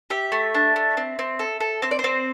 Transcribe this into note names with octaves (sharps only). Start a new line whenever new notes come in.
G4 E5
A3
D4
A3
C4
C4
A4
A4
C4 C5
D5
C5
C4